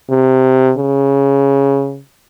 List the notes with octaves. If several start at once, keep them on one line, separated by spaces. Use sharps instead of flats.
C3
C#3